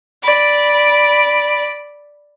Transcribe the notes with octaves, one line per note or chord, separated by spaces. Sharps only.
D5 B5